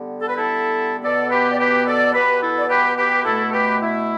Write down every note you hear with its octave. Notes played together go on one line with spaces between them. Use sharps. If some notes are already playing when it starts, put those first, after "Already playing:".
Already playing: D3 G3 B3
A4
B4
E4 A4
B2 B3 A4 D5
G4 B4
D5
G4 B4
A4 D5
B2 B3 G4 B4
E4 A4
D5
G4 B4
G4 B4
B2 A3 E4 A4
A4
G4 B4
E4